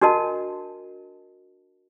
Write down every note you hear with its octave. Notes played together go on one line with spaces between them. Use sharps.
D4 F#4 A#4 D#5 A5